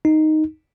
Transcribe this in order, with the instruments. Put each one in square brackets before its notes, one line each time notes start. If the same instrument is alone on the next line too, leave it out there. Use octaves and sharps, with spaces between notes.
[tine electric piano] D#4